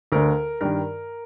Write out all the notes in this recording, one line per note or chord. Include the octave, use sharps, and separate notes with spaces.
D2 D3 A#4
G2 D#3 A#4